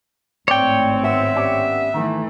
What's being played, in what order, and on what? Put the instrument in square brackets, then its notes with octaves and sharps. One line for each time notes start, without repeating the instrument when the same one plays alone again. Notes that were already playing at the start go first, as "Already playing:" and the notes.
[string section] G#1 A2 C4 [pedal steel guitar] C#5 G5 [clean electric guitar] D5
[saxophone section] B3 E5 [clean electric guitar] F#4
[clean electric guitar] C#4 G4 D5
[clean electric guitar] D#3 [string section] E3 A3